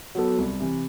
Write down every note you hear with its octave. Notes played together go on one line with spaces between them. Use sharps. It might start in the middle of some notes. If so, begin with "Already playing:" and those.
F#3 B3 F#4 A4
C2
C3 E3